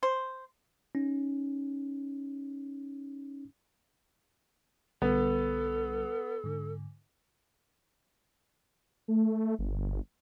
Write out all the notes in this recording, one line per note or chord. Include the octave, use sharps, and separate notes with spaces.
C5
C#4 D#4
B1 D3 G3 B3 A4
G#2 D3
A3
G1